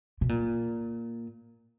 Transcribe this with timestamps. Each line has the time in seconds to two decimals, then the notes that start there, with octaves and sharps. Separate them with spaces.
0.21 B2
0.29 A#2